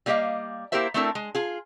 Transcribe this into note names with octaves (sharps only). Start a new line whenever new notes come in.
G3 A#3 G4 C#5 D#5 F5
A#3 E4 G4 A#4 C5 E5
A3 C4 D4 E4 A4 A#4
G#3
F4 G#4